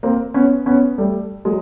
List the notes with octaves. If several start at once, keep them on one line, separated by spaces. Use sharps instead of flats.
A#3 C4
B3 C#4
B3 C#4
G3 A3
F#3 G#3